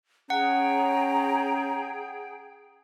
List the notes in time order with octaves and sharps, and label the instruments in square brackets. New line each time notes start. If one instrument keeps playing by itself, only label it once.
[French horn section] C#4 [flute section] G#4 G5 [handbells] F#5 [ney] A#5